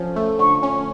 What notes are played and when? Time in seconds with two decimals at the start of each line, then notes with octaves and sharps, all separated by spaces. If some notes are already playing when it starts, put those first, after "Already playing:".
Already playing: D3 F3 C#4
0.16 A3
0.39 D3 C#6
0.63 C#4